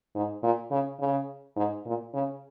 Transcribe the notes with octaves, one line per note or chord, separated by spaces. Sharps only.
G#2
A#2
C#3
C#3
G#2
A#2
C#3